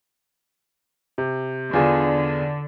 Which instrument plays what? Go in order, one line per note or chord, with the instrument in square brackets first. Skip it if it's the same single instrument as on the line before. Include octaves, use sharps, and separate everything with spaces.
[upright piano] C3
[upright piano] E2 F4 G#4 [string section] D3